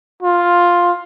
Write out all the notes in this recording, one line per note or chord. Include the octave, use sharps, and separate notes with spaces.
F4